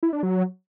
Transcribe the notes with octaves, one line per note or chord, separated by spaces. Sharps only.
E4
D4
F#3